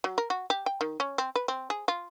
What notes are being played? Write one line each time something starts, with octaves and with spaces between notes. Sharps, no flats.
F#3
A#4
F#4
G4
G5
D#3
C#4
C4
B4
C4
G#4
F4